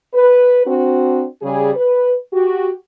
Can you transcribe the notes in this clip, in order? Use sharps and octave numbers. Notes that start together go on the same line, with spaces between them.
B4
C4 D4 F#4
C#3 G3 G#4
B4
F#4 G4